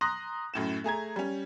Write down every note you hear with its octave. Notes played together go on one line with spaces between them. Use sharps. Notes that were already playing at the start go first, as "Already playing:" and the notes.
A#5 C6 D#6 F#6 A#6
F#2 A2 E7
A3 G#4 A#5 G#6
G3 C#4